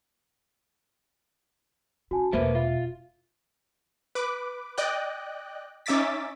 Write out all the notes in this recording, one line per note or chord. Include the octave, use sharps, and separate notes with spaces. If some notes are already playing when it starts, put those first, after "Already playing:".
C#3 F#4 G#5 A5
E1 C3 A3 A#3 B4 C5 E5
F4 E5
B4 D6
D5 D#5 G5 F#6
C#4 D#4 E5 D6 A6 B6